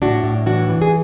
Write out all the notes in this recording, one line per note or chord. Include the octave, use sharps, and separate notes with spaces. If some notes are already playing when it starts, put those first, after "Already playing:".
A2 D4 F#4
A2
E3 D4 F#4
E3
G#4